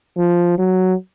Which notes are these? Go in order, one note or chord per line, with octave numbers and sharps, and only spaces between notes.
F3
F#3